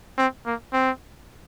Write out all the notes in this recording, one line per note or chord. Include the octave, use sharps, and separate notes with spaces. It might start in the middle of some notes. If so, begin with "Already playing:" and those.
C4
A#3
C4